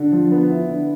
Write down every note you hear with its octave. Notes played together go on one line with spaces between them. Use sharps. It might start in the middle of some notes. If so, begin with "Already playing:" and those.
Already playing: D3
F3
B3
E4
D3